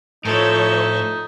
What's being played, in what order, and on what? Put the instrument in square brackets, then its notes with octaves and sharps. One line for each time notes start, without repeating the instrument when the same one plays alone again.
[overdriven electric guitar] A2 [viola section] F3 C5 C#5 [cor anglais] D#4 [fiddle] A4 E5